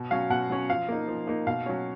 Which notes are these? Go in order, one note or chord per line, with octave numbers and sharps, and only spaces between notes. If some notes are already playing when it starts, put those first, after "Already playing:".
Already playing: B2
F#3 C#4 F5
B2 F#5
F#3 C#4
F3 F5
A#3 D#4
F3
A#3 D#4
B2 F5
F#3 C#4